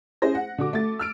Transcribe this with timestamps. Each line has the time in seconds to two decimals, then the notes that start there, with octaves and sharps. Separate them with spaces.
0.22 C#4 E4 G#4 C5 A#6
0.35 F#5
0.58 D3 F#4 D6
0.73 A3 A6
0.99 E6 F6 D7